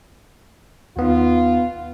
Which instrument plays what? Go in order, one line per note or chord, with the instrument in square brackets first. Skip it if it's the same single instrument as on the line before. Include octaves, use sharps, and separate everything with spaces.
[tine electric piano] D#2 B3 D#4 [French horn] F4